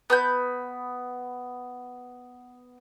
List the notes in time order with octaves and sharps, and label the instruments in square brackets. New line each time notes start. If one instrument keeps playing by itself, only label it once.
[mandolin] B3 B5 G6